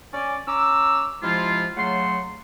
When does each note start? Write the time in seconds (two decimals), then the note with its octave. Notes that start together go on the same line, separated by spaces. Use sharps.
0.14 C#4 D5
0.48 C#4 A#5 D6 E6
1.23 C3 F3 G#3 E4 F4
1.77 C#3 F#3 A3 F#5 C6